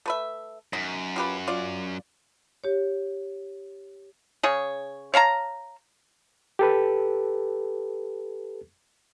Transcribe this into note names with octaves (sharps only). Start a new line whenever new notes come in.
A3 B4 E5
F#2 D#4
F4 G4 B4
F4 D5
G4 C#5
C#3 G#4 C#5
C#5 F5 A5 A#5
G4 A4 B4